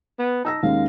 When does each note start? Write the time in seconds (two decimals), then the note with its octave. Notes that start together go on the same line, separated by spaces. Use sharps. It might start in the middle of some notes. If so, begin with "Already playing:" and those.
0.19 B3
0.45 D#4 A5 E6 A#6
0.63 D#2 G#3 C#4 F5